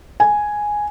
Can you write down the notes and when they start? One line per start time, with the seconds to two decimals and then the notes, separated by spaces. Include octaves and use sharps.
0.20 G#5